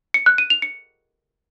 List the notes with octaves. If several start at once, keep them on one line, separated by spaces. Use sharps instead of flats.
C#7
F#6
D#7
F7
C#7